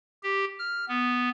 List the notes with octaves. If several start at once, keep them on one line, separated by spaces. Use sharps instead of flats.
G4
F6
B3